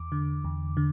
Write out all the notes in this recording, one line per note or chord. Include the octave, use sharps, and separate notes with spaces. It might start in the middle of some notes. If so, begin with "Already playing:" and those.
Already playing: E2 D6
D3
E2
D3